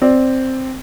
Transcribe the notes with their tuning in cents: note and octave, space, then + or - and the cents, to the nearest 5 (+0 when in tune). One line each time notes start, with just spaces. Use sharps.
C4 +0 D5 +0